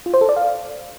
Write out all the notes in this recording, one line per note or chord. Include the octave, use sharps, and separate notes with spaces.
F4
C5
A4
D5
F5